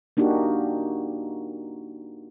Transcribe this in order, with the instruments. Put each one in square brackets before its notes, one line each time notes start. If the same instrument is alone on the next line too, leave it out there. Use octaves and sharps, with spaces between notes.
[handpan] A#3 D4 D#4 F#4 G4